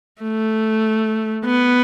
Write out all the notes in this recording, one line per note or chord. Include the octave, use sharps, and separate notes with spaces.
A3
B3